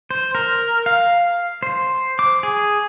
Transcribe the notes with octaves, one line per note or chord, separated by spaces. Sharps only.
C5
A#4
F5
C5
D6
G#4